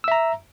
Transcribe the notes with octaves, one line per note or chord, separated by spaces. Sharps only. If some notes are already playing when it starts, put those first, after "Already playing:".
E5 A#5 E6